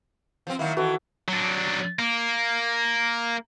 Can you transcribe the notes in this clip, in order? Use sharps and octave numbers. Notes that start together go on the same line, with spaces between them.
F3 C4
D#3 F#3 A#3 E4
D#3 E3 F#4 A4 B4
F#3 D4
A#3